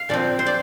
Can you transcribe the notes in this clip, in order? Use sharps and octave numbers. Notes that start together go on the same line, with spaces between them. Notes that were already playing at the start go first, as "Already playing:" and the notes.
Already playing: F5
A#2 F3 C4 D5
C5
D5